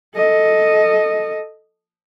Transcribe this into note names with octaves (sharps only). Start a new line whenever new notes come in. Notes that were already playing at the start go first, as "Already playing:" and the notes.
A4 D#5